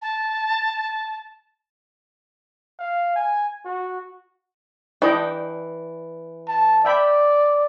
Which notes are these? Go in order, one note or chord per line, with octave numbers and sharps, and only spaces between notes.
A5
F5
G#5
F#4
E3 D4 D#5 G5
A5
D5 E5 G5 B5